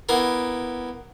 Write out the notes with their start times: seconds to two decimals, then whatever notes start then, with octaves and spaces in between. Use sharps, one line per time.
0.09 A#3 B3 E4